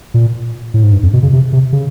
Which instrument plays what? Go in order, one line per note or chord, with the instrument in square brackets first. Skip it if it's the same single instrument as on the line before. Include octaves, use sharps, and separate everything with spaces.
[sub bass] A#2
A2
G#2
G2
F2
B2
C#3
C3
C3
C#3